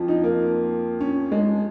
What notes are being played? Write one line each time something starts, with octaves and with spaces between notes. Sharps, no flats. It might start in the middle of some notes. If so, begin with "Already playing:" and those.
Already playing: F2 F3
D#4
A#3
C#4
G#3